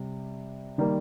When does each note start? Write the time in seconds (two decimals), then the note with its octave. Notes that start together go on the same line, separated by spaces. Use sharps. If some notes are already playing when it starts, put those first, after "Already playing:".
Already playing: C3 G3
0.78 D#3 G3 A#3